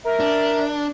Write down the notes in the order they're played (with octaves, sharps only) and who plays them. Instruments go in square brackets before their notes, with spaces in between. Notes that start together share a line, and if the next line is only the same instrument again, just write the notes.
[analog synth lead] A#4 [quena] E5
[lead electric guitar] D4